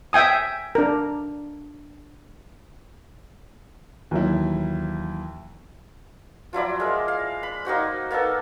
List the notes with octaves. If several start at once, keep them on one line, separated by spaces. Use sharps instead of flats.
E5 G5 G#5 D#6
D4 A#4
D#2 E3 F#3 E4
F3 F#3 E4 D5
G#3 A#4
F5
B5
A#3 D#4 F#4 C5
A#3 B3 D#4 A4